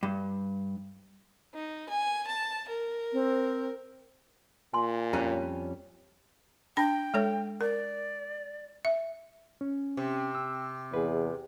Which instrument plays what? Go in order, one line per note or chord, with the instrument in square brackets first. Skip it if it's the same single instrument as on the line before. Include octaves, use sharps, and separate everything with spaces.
[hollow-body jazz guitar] G2
[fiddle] D#4
G#5
A5
A#4
[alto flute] C4
[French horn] A#2 [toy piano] G#5 C6
[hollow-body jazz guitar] F2 G3 C#4 [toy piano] E4 C5 C#5
[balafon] D4 B5 [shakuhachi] G5
[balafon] G#3 A4 C#5
[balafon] A#4 [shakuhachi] D5
[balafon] E5
[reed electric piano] C#4
[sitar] C3
[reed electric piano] E6
[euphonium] E2 [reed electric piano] G#4 B4